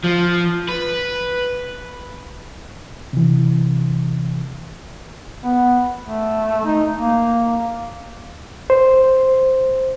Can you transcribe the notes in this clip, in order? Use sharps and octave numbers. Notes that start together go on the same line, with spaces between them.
F3
B4
C3 E3
B3
A3
D#4
A#3
C5